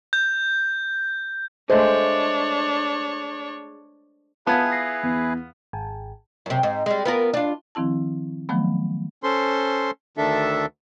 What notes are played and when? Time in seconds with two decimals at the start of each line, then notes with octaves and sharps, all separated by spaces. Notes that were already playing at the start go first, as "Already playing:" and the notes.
0.13 G6
1.70 G#3 A3 D4 C5 C#5
4.47 B3 E4 F4 G#4 B4 A5 B5 G#6
4.72 A#6 C7
5.03 E2
5.73 G#1
6.46 F#2 C3
6.63 G#2
6.86 G3 G#3
7.05 B3 F4 A#4
7.34 D4 F4
7.75 D#3 F3 C4 E4 A5
8.49 D#3 F3 F#3 A3 B3
9.23 C#4 A4 C5 C6
10.17 D2 D#3 D4 A4 E5